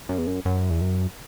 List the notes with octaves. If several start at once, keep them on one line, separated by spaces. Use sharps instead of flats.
F#2
E2
F#2
F#2
E2
F#2